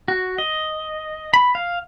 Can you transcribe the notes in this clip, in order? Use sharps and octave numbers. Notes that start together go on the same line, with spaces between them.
F#4
D#5
B5
F5